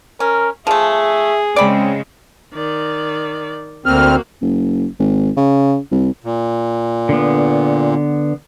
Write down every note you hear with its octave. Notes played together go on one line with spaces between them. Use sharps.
C#4 A#4
F3 A3 G#4 E5
C#3 G#3 C4 D5 B5
D#3 D5
D2 A#3 C4 F#4 F6
F#1
G#1
C#3
C2
A#2
D3 B3